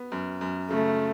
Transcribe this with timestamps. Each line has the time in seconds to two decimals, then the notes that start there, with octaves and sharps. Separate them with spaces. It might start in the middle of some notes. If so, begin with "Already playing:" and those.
Already playing: B3
0.12 F#2
0.41 F#2
0.70 C#3 A3